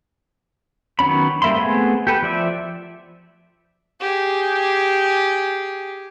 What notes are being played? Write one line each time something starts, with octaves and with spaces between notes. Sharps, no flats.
D#3 F#3 B3 C#4 B5
G3 A#3 E5 B5 C6
A3 B3 C4 G#4
G4 A4 B4
F3 D5 E5
G4 G#4